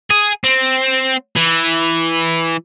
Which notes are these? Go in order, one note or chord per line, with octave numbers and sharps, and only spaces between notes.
G#4
C4
E3